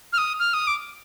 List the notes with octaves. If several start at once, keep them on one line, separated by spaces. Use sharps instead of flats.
F6
D#6
F6
D#6
D6